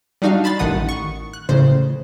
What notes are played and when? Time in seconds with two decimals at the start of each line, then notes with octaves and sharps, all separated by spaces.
0.22 G3 D4 D#4 F#4 F5
0.44 A5 B5 C6 A6
0.59 A1 D#3 F#5 D#6 D#7
0.89 C#6
1.33 F#6
1.49 A1 C#3 C5